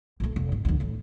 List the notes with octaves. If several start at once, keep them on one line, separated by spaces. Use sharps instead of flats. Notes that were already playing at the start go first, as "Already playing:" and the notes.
A#1 A3
F1
G#2
D2 D#3
A2 E3